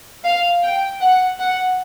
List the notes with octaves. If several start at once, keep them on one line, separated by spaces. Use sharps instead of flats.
F5
G5
F#5
F#5